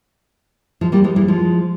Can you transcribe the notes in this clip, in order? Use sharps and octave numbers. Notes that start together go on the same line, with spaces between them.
F3 G#3
G3 A#3
F3 G#3
E3 G3
F3 G#3